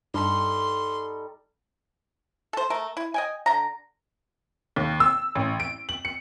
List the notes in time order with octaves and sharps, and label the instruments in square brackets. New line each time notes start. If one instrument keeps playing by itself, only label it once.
[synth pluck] G2 [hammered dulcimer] G3 D#4 A4 [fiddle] C6
[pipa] A4 C5
A3 A#4
E4
D#5 G5 G#5
D3 A#5
[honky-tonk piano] D#2
E6
A1
D7
F#7
C#7